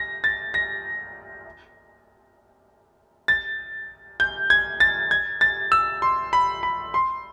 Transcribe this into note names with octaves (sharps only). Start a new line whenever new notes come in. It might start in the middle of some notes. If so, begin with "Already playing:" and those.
Already playing: A#6
A6
A#6
A6
G6
G#6
A6
G#6
A6
E6
C6
B5
B5
C6